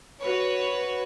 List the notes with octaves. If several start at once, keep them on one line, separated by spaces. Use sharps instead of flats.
F#4 B4 C#5